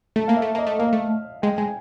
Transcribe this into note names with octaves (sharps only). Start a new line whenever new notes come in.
A3 A5
A#3 F5
E5
A3
A#3 D#5
A3
A#3 F5
A3
G#3 G5
G#3 G#5